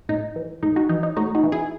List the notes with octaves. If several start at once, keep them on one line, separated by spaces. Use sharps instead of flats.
A2 D#4
E3
A2 D#4
D#4 F#4
E3 D#4
D#4
A2 D#4 F#4
D#4 F#4
E3
E4 G#4